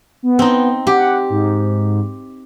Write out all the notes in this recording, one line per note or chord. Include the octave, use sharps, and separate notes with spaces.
B3
C4 D#4
G4 F#5
G#2